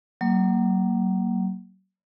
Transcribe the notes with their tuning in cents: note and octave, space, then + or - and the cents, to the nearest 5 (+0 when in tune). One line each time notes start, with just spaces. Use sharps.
F#3 +35 A#3 +0